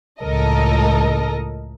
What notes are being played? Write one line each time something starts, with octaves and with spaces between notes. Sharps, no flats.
C#2 A2 A4 A#4 D#5